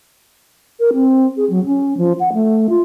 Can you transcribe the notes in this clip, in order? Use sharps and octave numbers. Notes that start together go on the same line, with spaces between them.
A#4
C4
G#4
F#3
C#4
F3
F#5
A3
F4